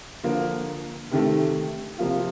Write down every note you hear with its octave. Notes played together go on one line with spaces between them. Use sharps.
D3 F3 A#3
C3 D#3 A3
C3 F3 A#3 F4